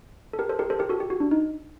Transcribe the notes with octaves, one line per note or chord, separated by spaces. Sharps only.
A4
G4 A#4
A4 C5
G4 A#4
A4 C5
G4 A#4
F#4 A4
G4
F#4
D4
D#4